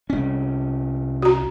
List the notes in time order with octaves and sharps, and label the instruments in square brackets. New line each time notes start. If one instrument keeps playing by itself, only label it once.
[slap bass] C2 C#4
[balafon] F#4 A#5